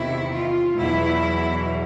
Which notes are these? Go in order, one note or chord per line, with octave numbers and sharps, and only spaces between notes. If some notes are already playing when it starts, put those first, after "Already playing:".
Already playing: E2 C3 D#3 E4
F4
E2 B2 F#3 E4